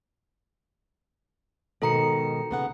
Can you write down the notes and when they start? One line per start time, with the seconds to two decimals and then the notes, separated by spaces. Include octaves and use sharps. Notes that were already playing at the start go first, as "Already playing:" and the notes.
1.82 G#2 B2 D#3 A4 A#5 C#7
2.51 C#3 B3 F#5